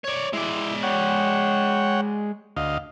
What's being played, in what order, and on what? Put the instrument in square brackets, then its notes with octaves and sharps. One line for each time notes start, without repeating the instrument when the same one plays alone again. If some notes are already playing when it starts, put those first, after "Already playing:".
[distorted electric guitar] C#5 D5
[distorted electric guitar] G#3 D5 [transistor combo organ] E4
[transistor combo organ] C#5 F#5 G5
D2 D#5 F5